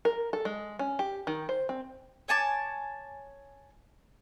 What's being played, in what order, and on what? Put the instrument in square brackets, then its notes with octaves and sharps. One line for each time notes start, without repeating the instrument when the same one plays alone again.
[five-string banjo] A#4
A4
G#3
C#4
G4
D#3
C5
C4
[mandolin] C#5 G#5 A5 D6